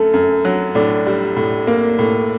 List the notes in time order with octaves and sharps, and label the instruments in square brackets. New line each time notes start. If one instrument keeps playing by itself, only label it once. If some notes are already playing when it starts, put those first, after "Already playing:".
Already playing: [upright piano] F#2 A3 A4
F#2
F#3
A2 D4
G3
A2
A#3
A2